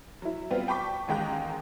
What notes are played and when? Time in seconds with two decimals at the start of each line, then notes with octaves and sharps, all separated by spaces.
0.22 F#3 E4
0.51 G3 B3 C4 F4
0.68 G5 A5 B5 C#6 D6 B6
1.08 A1 D#2 G#3 G5 A#5 F#6